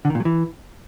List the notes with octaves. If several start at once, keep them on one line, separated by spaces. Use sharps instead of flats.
D3
D#3
A#2
F#3
E3